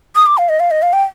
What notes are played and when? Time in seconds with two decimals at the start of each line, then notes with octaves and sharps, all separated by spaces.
0.16 D#6
0.26 D6
0.38 F5
0.49 D#5
0.60 F5
0.71 D#5
0.82 F5
0.93 G5